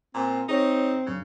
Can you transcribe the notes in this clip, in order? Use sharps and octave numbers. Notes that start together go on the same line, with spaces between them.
A#2 C4
C4 D#4 G#4 C#5
F#2 C#3 D4